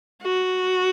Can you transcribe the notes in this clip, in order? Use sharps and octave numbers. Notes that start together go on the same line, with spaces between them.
F#4